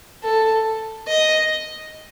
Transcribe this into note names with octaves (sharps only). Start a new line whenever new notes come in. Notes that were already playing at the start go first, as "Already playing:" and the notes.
A4
D#5